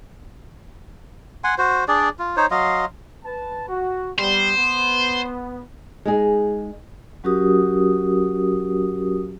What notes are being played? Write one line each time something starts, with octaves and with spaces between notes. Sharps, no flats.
F#5 G#5 C6
F#4 C5
D4 G#4 D5
F4
D#4 C5 C#5
F#3 D#5 F5 C6
B4 A5
F#4
G3 B3 C5
B3
G#3 D#4 G#4
F#3 C#4 F#4 G4 A#4 D#6